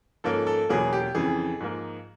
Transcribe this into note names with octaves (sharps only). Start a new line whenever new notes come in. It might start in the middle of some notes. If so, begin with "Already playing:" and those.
G#2 F3 A#3 C#4 A4
A4
E2 B2 F#3 A#3 C#4 G#4
G4
F2 C#3 E3 G#4
G#2 F3 A#3